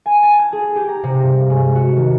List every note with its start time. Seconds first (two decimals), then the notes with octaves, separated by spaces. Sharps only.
0.06 G#5
0.23 A5
0.39 G#6
0.53 G#4
0.76 G4
0.89 A#5
1.03 C3
1.23 G2
1.50 G#3
1.75 F#4
1.96 D#3